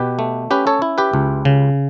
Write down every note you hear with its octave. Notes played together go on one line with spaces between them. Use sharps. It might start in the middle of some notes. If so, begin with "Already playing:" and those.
Already playing: B2 G4 B4
A3
C#4 G4 B4
A4 C#5
E4
G4 B4
C#2
C#3